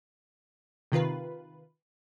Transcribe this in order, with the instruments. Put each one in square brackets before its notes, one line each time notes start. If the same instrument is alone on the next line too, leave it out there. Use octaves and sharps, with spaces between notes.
[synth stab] C3 D#3 F4 B4